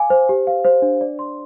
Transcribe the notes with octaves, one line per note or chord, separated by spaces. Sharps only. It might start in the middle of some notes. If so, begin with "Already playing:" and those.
Already playing: F5 G#5 D6
C5
G4
F5
C5
D4
D5
C6